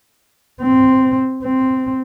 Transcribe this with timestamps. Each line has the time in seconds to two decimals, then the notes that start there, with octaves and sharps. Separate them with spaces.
0.62 C4
1.43 C4